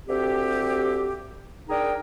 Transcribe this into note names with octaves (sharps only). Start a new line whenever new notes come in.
D2 C4 G4
D4 D#4 G#4 A#4 G5